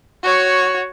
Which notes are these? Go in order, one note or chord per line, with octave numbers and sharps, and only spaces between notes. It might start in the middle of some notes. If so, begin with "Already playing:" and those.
F#4 C#5